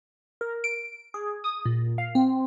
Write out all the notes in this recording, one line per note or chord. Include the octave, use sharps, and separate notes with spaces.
A#4
D7
G#4
D#6
A#2
F5
C4